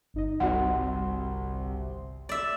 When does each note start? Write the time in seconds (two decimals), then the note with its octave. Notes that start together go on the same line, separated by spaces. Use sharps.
0.14 G1 D#4 D#5
0.40 G1 C2 F#4 F#5 C6
2.29 D5 E5